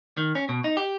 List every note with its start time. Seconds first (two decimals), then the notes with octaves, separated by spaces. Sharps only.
0.17 D#3
0.35 C#4
0.49 B2
0.64 D#4
0.77 G4